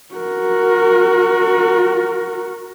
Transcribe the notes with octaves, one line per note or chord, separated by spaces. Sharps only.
F#4 A#4